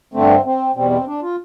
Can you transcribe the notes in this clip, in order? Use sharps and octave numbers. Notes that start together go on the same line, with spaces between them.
G2 D3 A3 C4
C4
E2 B2 G3 C4
C4
D4
F4